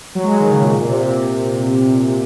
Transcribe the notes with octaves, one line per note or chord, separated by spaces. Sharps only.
F#3
G#3
F#3
D#3
C#3
A#2
A#2
C3
A#2
C3